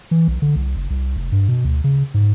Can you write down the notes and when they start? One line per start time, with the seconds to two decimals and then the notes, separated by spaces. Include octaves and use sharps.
0.11 E3
0.28 B1
0.42 D3
0.56 C2
0.76 F#1
0.90 C2
1.16 F1
1.32 G2
1.48 B2
1.65 D2
1.84 C#3
2.14 G#2